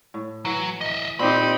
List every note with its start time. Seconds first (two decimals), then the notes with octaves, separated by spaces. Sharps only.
0.14 A2
0.45 E3 F#3 F#5
0.81 D#5 E5
1.20 A#2 C4 D#4 G4 B5